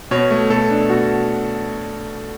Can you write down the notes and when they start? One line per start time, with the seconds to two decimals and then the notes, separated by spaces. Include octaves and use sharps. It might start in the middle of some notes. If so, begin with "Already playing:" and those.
0.11 B2 C#5
0.31 A3
0.50 B2 A4
0.70 D4
0.89 B2 F#4